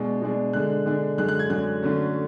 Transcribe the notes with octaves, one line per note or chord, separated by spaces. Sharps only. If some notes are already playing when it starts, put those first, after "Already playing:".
Already playing: B2 G#3 D4
B2 G#3 D4
D3 G#3 D4 F#6
D3 G#3 D4
F#2 D3 G#3 F#6
F#6
G#6
F#2 D3 G#3 F#6
D3 F#3 A3 C#4